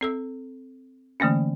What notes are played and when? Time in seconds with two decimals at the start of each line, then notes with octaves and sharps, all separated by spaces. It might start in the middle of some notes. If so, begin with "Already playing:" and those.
0.01 C4 A4 E6
1.20 D3 E3 A3 A#3 C#4